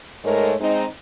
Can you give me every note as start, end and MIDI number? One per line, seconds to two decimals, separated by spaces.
0.25 0.55 44
0.25 0.55 56
0.25 0.55 57
0.25 0.55 70
0.25 0.55 73
0.60 0.86 56
0.60 0.86 60
0.60 0.86 63